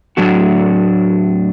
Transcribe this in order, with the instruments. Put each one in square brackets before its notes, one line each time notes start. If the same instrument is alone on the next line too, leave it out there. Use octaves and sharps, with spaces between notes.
[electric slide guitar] A2 F#3 A3 D4 F#4